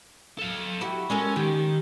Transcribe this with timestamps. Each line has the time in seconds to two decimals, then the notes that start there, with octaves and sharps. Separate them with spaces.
0.39 A4 F5
0.81 E4 F#4 G4
1.10 G#3 C#4 A4 A#4
1.36 D#3 G4